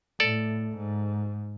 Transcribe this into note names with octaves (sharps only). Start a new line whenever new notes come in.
A2 A4 D5
G#2